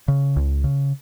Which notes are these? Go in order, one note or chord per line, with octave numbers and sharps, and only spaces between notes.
C#3
C#2
C#3